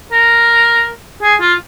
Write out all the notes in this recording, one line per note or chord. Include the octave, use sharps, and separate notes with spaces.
A#4
G#4
F4